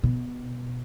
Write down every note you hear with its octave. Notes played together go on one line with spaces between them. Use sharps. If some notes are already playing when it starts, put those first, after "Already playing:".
B2